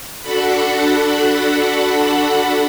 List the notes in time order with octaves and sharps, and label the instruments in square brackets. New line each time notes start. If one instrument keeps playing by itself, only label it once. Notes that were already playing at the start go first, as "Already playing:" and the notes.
[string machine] D4 F#4 A4 F#5 B5